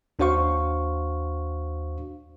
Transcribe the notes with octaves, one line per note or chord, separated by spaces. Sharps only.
D#2 D4 F#4 C5 F5 C#6